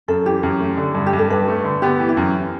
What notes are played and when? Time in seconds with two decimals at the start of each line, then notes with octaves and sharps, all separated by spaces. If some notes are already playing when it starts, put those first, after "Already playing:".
0.08 F#2 A4
0.25 E3 G4
0.43 F#2
0.60 A3
0.77 D3
0.95 G2
1.07 G4
1.13 G2
1.19 A4
1.30 G2 B4
1.48 A3
1.64 D3
1.82 B3 G4
2.00 E3
2.09 E4
2.17 F#2